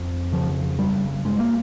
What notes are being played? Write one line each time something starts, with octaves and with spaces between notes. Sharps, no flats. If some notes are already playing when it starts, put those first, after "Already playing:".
Already playing: F2
C#3 F3
G2 G3
G2 G#3
A#3